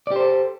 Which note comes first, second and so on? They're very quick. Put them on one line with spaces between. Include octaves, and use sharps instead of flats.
D5 G4 C5 A4